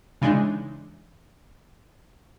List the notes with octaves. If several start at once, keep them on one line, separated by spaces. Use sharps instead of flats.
C#3 E3 G#3 D4 D#4